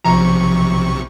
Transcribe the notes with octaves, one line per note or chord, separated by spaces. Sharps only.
B1 C3 F3 A#5 C#6